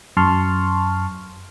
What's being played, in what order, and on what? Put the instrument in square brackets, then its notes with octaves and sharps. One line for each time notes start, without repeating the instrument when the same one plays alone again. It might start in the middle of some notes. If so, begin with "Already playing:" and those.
[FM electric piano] F#2 A5 C6 C#6 F6